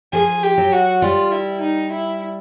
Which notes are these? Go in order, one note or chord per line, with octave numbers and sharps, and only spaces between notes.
F3 G#4
G4
F#3
F#4
G3 F4
E4
D#4
E4